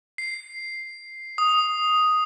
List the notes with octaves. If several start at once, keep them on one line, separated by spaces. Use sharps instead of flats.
C7
D#6